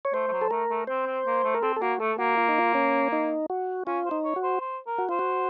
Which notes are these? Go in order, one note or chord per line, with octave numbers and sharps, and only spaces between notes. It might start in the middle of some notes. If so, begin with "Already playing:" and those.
C#5
A3 C5
A3
F#3
A4
A3 A#4
A3
C4 C5
C4
A#3
A3
A#4
C4 A4
A4
A#3 F#4
A3 A4
A#3 F#4
F4
D#4
F4
C#4
D#4
F#4
C#4 F4
C5
D#4
C#5
F#4
C5
C5
A#4
F#4
F4 C5
F#4